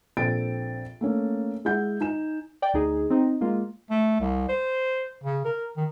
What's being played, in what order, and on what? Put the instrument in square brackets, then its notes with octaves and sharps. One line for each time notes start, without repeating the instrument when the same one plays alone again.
[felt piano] A#1 C4 A4 G5 A6 D7
A3 A#3 C#4
G#3 E4 F#5 G6
D#4 G#5 E7
[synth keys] D5 G5
D2 D#4 G#4
C4 D#4
G#3 A#3 F4
[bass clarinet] A3
C2
C5
C#3
A#4
D#3